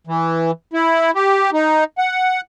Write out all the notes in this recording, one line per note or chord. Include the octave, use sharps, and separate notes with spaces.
E3
E4
G4
D#4
F#5